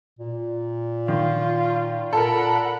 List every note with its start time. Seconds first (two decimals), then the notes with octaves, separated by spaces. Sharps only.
0.19 A#2
1.08 D#3 F4
2.13 A#2 A4 A#4 F#5 B5